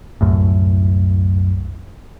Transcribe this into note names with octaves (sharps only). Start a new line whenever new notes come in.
C2 F#2 A2